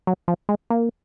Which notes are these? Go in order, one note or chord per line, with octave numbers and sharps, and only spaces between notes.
F#3
F3
G#3
A#3